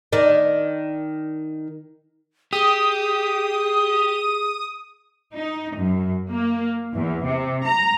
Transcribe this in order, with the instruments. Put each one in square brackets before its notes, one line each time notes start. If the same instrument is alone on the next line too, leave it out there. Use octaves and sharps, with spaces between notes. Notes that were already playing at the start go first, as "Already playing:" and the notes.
[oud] D#3 D4
[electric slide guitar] G4 [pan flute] G#4 [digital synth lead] D#6
[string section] D#4
F#2
A#3
E2
C3
A#5